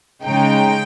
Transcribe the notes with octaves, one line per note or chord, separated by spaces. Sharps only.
C#3 G#3 D#4 G5